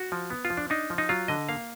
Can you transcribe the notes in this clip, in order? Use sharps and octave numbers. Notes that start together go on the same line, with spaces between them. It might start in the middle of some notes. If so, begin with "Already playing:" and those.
Already playing: F#4
F3
B3
F4
F3
D4
D4 D#4
F3
D#4
F#3 F4
D3 D#5
A#3 F5